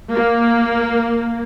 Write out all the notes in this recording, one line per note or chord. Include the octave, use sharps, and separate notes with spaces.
A#3